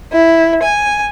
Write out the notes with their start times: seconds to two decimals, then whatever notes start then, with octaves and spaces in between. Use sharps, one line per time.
0.14 E4
0.64 G#5